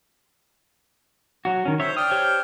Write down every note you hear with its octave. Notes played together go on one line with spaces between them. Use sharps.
F#3 F#4
D#3 C#4
C5 C#5 E5
D4 G5 D#6 F6
G4 C5 C#5